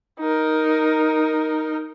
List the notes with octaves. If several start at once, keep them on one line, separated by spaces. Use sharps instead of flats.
D#4 A#4